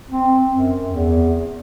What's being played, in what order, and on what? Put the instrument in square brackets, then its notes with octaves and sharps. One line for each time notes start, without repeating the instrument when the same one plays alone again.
[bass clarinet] C4
F#2
E2